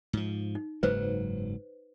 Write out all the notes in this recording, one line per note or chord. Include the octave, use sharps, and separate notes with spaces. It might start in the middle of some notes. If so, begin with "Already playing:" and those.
G#2 F3
D#4
F#1 G#2 F#3 B4 C5